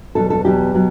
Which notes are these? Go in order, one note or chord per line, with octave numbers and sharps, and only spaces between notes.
E2 B2 F#3 A4
A4
E2 B2 F#3 G4
B2 F#3